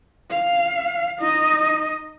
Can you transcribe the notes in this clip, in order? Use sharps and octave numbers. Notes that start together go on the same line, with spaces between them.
F5
D#4 D#5